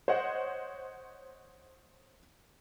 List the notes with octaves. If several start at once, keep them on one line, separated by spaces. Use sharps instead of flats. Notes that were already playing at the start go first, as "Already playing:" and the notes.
C5 C#5 D#5 F#5